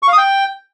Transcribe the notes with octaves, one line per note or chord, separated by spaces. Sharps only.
C#6
F5
D#6
G5